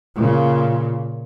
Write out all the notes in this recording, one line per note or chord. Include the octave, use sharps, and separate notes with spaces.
A#2 C#3